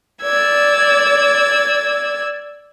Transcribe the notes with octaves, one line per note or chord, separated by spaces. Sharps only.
D5 E6 G#6